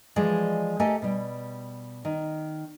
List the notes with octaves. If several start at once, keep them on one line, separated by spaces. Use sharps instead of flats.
E3 F3 G#3 D5 D#5
A3 G4 A4 A#4 D#5 G#5
B2 G3
D#3